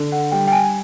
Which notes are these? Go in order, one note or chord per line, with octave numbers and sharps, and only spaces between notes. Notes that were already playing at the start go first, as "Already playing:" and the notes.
Already playing: D3
F#5
G3 G5
G5
G#5